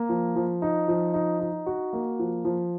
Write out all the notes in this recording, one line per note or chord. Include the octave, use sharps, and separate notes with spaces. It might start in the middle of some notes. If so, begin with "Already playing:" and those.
Already playing: A#3
F3
F3
D#4
F3
D#4
D#4
F#4
A#3
F3
F3